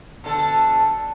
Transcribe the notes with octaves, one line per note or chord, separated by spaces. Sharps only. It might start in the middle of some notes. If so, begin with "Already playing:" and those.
B2 D3 A4